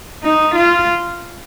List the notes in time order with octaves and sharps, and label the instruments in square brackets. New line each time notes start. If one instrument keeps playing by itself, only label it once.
[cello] D#4
F4